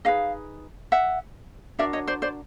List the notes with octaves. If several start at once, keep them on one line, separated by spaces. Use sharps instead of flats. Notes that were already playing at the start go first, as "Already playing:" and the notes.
D#4 G#4 B4 D#5 F5
E5 F#5
D4 F#4 A#4 D5 E5
C#5 D#5
C5 D5
C5 D5